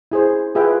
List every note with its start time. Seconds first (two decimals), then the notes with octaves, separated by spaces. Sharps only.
0.12 E4 G#4 C5
0.55 F4 G#4 B4 E5 G5